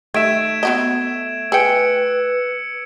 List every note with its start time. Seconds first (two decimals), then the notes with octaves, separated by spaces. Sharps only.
0.14 D#3 G3 A3 E5 G#6 D7 E7
0.63 B3 F#4 D#5
1.52 G#4 B4 G5 E6 C#7 D7